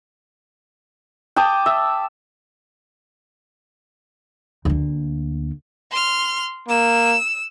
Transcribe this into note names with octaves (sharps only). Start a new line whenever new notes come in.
G5 A5 D6 D#6
E5
D2 A#3
C6 F6
A#3 E6